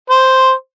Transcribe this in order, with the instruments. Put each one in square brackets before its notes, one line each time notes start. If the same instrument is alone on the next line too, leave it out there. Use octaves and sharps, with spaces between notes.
[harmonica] C5